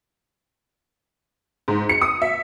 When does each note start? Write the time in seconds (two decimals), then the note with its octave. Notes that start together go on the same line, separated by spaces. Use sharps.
1.68 G#2
1.89 C#7
2.01 D#6
2.22 E5